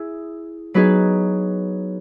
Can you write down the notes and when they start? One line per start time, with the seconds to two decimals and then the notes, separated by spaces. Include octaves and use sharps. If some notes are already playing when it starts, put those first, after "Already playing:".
Already playing: E4 G#4
0.74 F#3 B3 D#4 G#4 B4